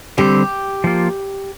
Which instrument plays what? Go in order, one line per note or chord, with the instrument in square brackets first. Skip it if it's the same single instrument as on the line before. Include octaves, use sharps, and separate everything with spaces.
[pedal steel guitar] D3 G3 C4 [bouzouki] G4
[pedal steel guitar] F3 A#3 F4